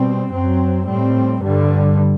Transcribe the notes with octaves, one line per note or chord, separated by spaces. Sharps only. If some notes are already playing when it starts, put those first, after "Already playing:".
Already playing: B2 G3 C4
F#2 F#3 C4
A2 G3 C4
G2 D3 G3